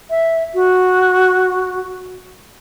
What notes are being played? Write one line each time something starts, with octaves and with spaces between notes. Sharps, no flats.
E5
F#4